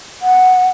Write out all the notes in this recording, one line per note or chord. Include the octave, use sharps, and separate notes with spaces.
F#5